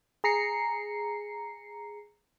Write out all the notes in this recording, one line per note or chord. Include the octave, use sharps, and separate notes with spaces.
G#4 A#5 C7 C#7